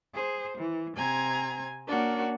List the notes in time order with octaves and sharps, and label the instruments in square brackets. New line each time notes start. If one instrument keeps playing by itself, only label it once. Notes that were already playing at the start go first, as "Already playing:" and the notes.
[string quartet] G#4 C5
E3
C3 C4 G#5 A#5 G#6
A#3 C#4 D4 F#4 A#4